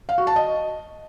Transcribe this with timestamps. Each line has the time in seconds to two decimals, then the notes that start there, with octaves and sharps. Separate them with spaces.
0.09 F5
0.18 F#4
0.27 A5
0.36 D#5